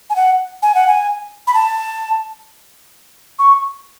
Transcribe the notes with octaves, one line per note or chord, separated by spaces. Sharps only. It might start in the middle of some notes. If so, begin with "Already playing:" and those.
G#5
F#5
G#5
F#5
G#5
B5
A5
C#6